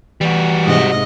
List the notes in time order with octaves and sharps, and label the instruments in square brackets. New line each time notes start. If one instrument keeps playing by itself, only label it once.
[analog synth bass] E3 [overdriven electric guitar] G3 F#4
[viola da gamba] G#2 C3 D#5